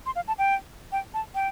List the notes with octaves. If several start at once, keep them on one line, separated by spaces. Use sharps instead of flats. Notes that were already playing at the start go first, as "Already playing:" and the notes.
C6
F5
A5
G5
G5
A5
G5